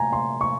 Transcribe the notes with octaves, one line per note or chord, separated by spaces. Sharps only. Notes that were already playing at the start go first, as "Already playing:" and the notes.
Already playing: G#5 A#5
C6
C#6